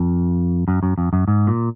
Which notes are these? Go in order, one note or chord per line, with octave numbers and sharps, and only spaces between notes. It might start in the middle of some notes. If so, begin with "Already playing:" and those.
Already playing: F2
F#2
F#2
F2
F#2
G#2
A#2